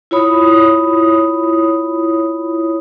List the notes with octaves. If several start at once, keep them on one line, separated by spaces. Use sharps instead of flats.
E4 F4 C#5 B5 D#6